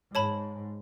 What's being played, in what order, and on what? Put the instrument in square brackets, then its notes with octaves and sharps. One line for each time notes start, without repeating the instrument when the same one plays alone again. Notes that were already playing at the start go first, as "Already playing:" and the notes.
[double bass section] G#2 [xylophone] C#5 A5 B5